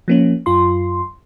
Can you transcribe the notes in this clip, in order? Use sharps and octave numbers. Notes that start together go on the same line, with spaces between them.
F3 A#3 C#4
F#2 F4 C6